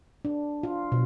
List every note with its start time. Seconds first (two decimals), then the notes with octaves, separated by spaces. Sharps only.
0.25 D4
0.63 F4
0.92 B2